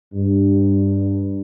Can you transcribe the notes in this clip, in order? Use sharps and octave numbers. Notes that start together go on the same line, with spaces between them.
G2